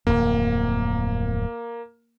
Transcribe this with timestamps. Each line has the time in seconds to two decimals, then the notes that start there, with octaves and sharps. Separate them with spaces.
0.07 D1 F2 A#3